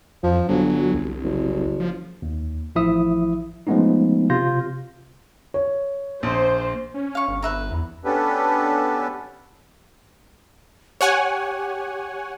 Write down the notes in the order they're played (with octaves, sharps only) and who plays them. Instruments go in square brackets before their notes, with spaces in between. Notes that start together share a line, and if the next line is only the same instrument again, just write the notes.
[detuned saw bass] F2 [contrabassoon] F3
[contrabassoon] G1 [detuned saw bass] F#3
[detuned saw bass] C2
[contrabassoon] F#1
[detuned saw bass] F3
[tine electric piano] D#2
A1 F3 E4 E5 D#6
F3 G#3 A3 B3 C#4 D#4
C3 F4 G6 A#6
[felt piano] C#5
[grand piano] A#1 [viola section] C5
[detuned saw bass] C#4
[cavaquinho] F5 C#6
[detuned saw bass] G1
[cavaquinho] B4 E5 A#5
[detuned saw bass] E2
[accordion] B3 C#4 D4 G4 A4 B4
[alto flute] G4 [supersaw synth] C#5 F#5 G#5